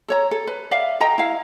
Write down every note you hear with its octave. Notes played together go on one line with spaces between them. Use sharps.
A4 C#5 A#5
A4
B4
D5 E5 F5
A4 D#5 G5 A#5
E4 F5